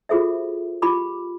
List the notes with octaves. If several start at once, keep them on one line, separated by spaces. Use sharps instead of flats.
F4 F#4 G#4 A4 C5 E5
F4 G4 B5 D6